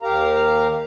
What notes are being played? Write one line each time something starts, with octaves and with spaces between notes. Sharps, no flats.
D#2 G4 A#4 F5 A#5